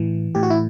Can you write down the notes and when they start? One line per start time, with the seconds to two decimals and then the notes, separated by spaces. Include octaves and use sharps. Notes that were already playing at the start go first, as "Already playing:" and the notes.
Already playing: A2 E3
0.35 A2 G4
0.43 F#4
0.50 E4